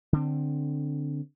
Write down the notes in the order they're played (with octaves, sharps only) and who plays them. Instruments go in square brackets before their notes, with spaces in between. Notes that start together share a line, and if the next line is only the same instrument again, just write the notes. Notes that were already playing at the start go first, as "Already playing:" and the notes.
[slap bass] D3 C4